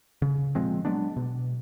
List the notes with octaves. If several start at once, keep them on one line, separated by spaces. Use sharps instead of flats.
C#3
A#2 F3 G#3 C4
F#3 G#3 B3 D4
B2